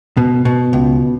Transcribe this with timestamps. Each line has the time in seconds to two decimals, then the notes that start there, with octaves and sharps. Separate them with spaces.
0.17 B2
0.45 B2
0.73 C#2